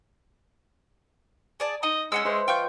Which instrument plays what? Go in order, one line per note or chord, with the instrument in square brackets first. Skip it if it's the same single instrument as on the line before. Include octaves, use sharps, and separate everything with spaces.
[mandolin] G#4 D5 A5
[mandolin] D#4 [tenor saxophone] D#5
[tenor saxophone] G#3 [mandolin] C#4 F#5 E6
[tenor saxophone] G#3 [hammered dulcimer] B4 C5 E5
[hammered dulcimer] F3 D#5 [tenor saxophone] F4 [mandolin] G5 C#6 G6